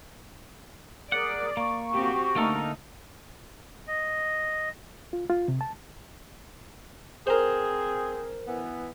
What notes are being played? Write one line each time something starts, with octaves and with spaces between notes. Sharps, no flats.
G#4 A#4 D5 F#5
A#3 C#6
C4 F#4 G4
D3 A3 A#3 D#4 A4 A#4
D#5
F4
F4
C3
A5
C4 G#4 A#4 C5
E3 B3